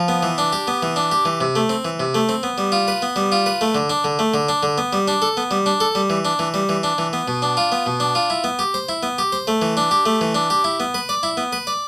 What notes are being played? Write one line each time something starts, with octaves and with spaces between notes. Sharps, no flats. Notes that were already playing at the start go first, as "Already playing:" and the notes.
Already playing: F3
B3
E3
D4
G4
B3
E3
D4
G4
E3
C3
A3
C4
E3
C3
A3
C4
B3
G3
F4
B4
B3
G3
F4
B4
A3
D3
D4
D3
A3
D3
D4
D3
B3
G3
D4
A4
B3
G3
D4
A4
G3
E3
D4
E3
G3
E3
D4
E3
B3
B2
D4
F4
B3
B2
D4
F4
E4
B3
G4
C5
E4
B3
G4
C5
A3
E3
D4
G4
A3
E3
D4
G4
E4
B3
B4
D5
E4
B3
B4
D5